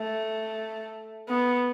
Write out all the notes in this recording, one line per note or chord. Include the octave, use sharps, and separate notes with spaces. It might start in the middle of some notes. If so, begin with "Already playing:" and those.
Already playing: A3
B3